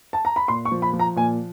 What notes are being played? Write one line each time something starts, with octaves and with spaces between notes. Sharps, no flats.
A5
A#5
B5
A#2 C6
C#6
F3
B5
F3
A#5
A#2 G#5